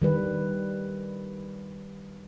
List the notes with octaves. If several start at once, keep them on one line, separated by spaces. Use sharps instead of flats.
D#3 G3 B4